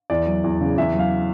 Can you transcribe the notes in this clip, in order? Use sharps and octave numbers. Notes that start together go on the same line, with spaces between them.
E2 D5
F#3
E2
C#3
E2 E5
F#3
F5